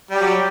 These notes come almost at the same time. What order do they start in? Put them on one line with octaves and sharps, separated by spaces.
G3 G4 F#3